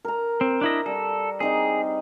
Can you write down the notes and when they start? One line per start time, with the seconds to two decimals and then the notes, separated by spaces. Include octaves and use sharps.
0.05 A#4 A#5
0.41 C4
0.61 D4 E4 D#5
0.86 G3 A4
1.40 C4 D#4 G#4 D#5